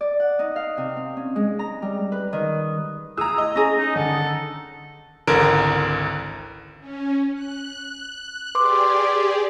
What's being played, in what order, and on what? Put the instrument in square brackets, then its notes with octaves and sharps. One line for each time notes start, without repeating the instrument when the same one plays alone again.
[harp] D5
F#5
D#4
F5
C3
C4
C#4
G#3
A#5
G3
B4
D#3
[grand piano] E4 G#4 [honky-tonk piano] A#5 E6 [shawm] D#6
[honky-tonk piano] D#5
[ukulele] C#4 G#4 [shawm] A#5 [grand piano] A#6
[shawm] D#4
[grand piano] D3 D#3 [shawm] A4
[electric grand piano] G#1 C#2 D3 E3 A#4 D7
[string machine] C#4
F#6
[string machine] G4 G#4 D5 [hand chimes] B4 C6 D6